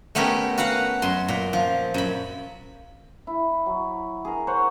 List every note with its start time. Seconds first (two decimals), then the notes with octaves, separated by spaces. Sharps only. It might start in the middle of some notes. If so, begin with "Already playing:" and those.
0.15 A3 B3 C#4 G4 A#4
0.58 F#4 B4 F5 F#5
1.02 F#2 C6
1.28 A#2
1.53 F3
1.94 F#2 B5
3.27 E4
3.66 F#3
4.25 G#4 A#4
4.47 C5 C#5 F#5